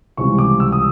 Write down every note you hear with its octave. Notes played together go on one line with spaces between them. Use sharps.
C#2 C3 E3 G3 C#6
D6
E6
D#6